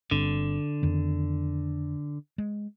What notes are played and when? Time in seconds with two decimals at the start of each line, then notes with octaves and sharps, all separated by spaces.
0.11 G1 G2 D3 C4
0.82 F2 D#3 B3
2.38 G#3